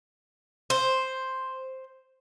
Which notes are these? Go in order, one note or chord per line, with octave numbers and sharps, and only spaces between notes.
C5